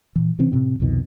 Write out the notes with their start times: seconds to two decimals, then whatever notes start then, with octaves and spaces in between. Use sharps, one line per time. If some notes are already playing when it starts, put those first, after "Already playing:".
0.16 A#2 E3
0.39 C3 E3 C4 C#4
0.52 A2 C3 C4
0.80 C2 F2 B2 D#3